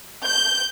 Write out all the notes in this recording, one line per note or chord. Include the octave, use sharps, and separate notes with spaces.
G6